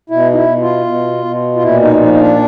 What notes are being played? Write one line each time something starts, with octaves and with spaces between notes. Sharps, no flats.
B2 E4
D#4
E4
B2
F4
B2
B2
F4
A#2 E4
D#4
F3 D#4
D#4
D4